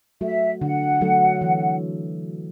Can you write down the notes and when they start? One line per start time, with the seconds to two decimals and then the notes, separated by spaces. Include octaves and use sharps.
0.21 F#3 A3 F#4 A4 E5
0.61 D3 F#5
1.01 F#3 A3 F#4 A4
1.41 E3